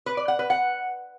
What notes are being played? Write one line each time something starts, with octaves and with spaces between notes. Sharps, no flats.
B4
D5
F#5
B4
F#5